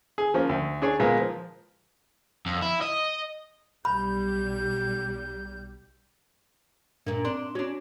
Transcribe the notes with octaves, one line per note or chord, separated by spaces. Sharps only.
G#4
F3 A#3 C#4
D2
D4 G#4 C#5
A#2 G#3 A#3 B3
F3
F2
E4
D#5
B1 G3 B5 G6
G2 A#2 A#3 D4
C4 D4 C6
C#4 D4 F#4